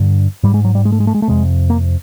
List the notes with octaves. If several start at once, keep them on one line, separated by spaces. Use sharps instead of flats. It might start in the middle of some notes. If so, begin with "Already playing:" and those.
Already playing: G2 D3
G#2 G3
G#3
F#3
G3
G#3
A3
G#3
A3
G#3
A3
F2 C3 G#3
A#3